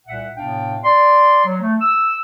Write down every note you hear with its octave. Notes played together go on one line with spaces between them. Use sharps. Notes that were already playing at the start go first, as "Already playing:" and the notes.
C2 A#2 E5 F#5
A2 C3 B3 D4 F5 G5
D5 C6
F#3
A3
E6